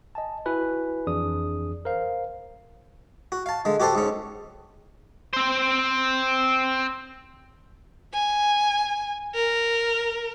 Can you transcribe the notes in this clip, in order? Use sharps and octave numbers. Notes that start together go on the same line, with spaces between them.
D#5 G#5 A5
E4 F#4 B4 G#5
F2 E3 D4 G#4 D5 D#6
A#4 C5 F5
F#4
F5 A5
D3 G#3
F#4 G4 A4 C5 A5
G#2 C#4
C4 C5
G#5
A#4